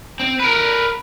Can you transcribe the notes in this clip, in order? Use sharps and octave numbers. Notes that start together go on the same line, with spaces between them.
C4
A#4 B4